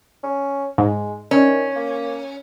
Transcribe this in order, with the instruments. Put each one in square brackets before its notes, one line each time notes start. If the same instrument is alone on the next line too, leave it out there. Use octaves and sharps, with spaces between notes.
[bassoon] C#4
[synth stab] G#2 [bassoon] G#3
[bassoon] D#3 [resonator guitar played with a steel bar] C#4
[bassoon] A#3